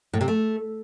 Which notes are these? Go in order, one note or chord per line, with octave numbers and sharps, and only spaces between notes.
A2
C3
A3